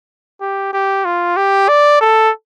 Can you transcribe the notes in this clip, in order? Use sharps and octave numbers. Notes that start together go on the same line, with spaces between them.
G4
G4
F4
G4
D5
A4